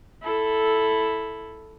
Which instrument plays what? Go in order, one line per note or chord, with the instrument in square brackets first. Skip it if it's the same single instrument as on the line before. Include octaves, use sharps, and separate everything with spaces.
[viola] E4 A4